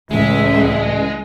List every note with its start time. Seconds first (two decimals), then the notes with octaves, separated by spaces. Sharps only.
0.11 C#2 A2 E3 G#3 E5